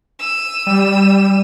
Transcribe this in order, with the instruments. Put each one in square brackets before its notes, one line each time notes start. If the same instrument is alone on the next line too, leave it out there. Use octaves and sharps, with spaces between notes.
[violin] E6 D#7
[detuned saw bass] G3